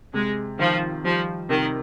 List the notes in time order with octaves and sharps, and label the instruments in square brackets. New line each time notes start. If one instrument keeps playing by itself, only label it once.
[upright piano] C3 [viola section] G#3
[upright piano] D#3 [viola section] F3
[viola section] F3 [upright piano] G3
[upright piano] C3 [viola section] D#3